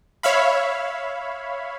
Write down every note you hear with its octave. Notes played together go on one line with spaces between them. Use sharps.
C#5 E5 F5 B5